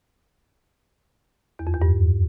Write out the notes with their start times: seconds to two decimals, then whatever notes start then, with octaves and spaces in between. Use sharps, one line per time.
1.59 E2
1.67 F2
1.74 E2
1.82 G2